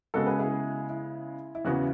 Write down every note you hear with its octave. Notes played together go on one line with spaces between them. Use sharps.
C#3 G#3 B3 F#4 A4
G#4 B4
E4 G#4
E4
E4
E2 C#3 E3 B3 F#4